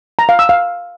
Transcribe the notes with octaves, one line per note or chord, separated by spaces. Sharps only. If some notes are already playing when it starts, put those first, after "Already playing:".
A#5
F5
E6
F5